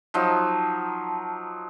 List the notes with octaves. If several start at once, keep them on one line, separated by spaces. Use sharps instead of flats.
F3 F#3 D#4